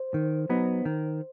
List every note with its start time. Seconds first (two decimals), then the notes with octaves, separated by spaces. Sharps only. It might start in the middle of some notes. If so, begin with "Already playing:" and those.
Already playing: C5
0.14 D#3
0.50 F#3 B3 D#4
0.85 D#3